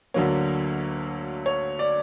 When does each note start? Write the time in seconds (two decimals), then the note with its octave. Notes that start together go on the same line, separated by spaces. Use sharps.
0.14 D2 D3 F#3 A#3 C#5
1.46 C#5
1.79 D5